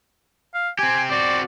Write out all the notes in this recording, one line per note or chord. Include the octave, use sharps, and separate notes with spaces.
F5
C4 G4 G#5
C4 F#4 D5